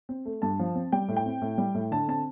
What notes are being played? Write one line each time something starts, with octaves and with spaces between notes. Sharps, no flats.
C4
A3
G2 A5
F3
C4
G3 G5
A2
G5
C4
A2
G3
A2
D3 A5
C4 A5